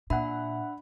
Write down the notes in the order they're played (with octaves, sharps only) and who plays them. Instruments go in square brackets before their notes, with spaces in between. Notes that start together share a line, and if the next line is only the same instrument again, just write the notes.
[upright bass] A#2 [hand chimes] D4 B5 [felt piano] E5 F#5